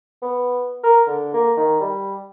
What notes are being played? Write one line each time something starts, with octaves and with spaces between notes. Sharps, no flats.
B3
A#4
D3
A#3
D#3
G3